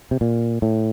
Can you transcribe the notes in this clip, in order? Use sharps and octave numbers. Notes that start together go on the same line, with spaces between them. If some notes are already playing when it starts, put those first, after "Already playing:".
C3
A#2
A2